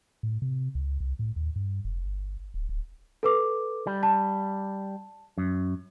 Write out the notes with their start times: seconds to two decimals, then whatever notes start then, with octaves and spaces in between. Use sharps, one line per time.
0.23 A2
0.42 C3
0.75 C#2
1.00 C2
1.19 A2
1.36 D#2
1.56 G2
1.85 F1
2.05 G1
2.54 D1
2.69 D1
3.23 A4 B4 D6
3.87 G3
4.03 A5
5.38 F#2